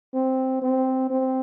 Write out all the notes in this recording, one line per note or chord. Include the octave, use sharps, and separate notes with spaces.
C4
C4
C4